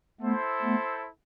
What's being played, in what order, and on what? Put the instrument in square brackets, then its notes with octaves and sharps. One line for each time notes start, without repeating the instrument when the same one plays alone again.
[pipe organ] A3 B3 [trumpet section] E4 A4 C5
[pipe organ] A3 B3